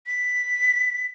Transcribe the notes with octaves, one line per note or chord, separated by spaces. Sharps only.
B6